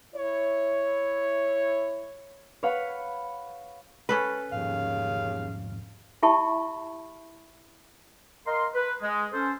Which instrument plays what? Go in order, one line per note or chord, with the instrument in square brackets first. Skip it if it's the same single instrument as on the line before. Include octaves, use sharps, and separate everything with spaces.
[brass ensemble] E4 C#5
[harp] B4 C#5 F5 F#5 B5
[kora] C#4 A4 B4
[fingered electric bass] E1 G#2 F3 [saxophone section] D#2 C#3 F5
[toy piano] E4 G4 E5 A5 B5 C#6
[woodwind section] A#4 D#5 F5 A#5 C6
B4
G#3
C#4 A4 C5